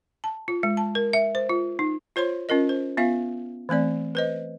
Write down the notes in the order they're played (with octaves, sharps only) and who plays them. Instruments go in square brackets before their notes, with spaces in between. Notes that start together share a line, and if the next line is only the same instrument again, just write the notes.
[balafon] A5
F4
G#3
A5
A#4
E5
C5
F4
D#4
F4 C5 C#5 C6
C#4 F4 A#4 D#5
C5
B3 F4 E5 F5
E3 A3 C4 D5
B4 C5 D#5